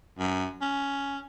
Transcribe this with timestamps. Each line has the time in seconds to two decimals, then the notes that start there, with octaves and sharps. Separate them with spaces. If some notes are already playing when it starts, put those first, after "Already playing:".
0.19 F#2
0.61 C#4